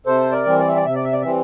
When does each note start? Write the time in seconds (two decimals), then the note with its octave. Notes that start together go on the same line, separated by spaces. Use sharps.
0.06 C3 A4 C5
0.32 A#4 D5
0.46 E3 G3 C4
0.59 D5
0.68 E5
0.76 D5
0.85 C3 E5
0.95 D5
1.04 E5
1.13 D5
1.22 E3 G3 C4 E5